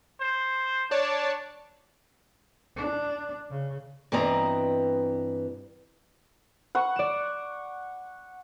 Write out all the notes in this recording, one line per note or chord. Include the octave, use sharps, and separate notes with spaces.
C5
D4 C#5 D5 A5
D4
C#3
G2 E3 B3 C4 D#5 A#5
F#5 C#6
D5 E7